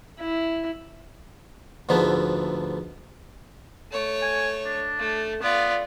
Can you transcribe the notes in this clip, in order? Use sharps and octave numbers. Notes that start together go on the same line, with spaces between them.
E4
D2 G#2 D3 F3 A3 B3
A3 C#5
G#5
D4
A3
B3 F4 D5